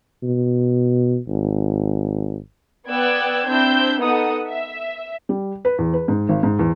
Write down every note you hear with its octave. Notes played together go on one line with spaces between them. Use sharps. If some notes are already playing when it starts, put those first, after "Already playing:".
B2
G#1
B3 D5 G5 E6 F#6 G#6
C4 D4 E4 E6 G6
B3 D#4 A4 F#5 D#6
E5
G3
B4
E2
B4
G#2
G#1
G#2
E2